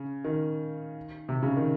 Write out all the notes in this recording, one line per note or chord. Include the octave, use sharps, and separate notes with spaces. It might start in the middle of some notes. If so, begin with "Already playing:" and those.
Already playing: C#3
D#3
C3
C#3
D#3